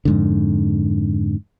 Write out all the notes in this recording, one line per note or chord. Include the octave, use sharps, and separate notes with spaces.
F2 G#2 D3